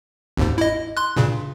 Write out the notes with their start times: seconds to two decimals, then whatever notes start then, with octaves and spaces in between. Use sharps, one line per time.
0.37 G#1 D#2 G#2
0.58 E4 D#5
0.97 C6 F#6
1.17 G2 A#2 C#3